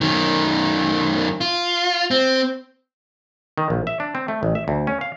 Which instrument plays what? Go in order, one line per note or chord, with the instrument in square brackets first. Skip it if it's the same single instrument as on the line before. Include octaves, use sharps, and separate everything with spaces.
[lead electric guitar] F#2 D#3
F4
C4
[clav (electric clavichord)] D#3
A#1
E5
D4
C4
A3
A1
E5
D2
C#4
F5